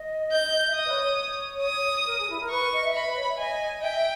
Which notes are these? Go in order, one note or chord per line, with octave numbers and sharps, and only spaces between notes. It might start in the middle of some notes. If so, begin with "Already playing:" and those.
Already playing: D#5
G6
E5
D#5 D#6
B4
C#5
C#5
D#6
A#4
G#4
E4
A#4
B4 C#6
D#5
E5
D#5 B5
B4
C#5
E5
D#5 G#5
E5 G5